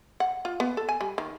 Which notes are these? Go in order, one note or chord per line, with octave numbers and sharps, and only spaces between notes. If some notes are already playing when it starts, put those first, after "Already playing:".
F#5
F4
B3
A4
G#5
G3
D#3